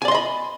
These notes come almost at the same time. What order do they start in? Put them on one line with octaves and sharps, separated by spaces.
G#5 D5 C6 D#5 B5